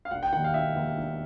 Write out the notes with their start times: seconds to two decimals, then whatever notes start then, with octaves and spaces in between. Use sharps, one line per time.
0.05 F5
0.11 E1 F#5
0.23 G5
0.33 D#2 D#3 F#5
0.44 F5
0.54 E1 E5
0.75 D#2 D#3
0.98 E1